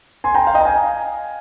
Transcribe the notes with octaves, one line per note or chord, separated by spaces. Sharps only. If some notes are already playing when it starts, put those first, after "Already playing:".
G#5 C6
G5 A#5
F5
D#5 G5
A#5
F5 G#5